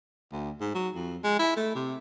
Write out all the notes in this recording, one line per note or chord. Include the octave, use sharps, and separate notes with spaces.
D2
G#2
F#3
F2
G#3
E4
A3
C3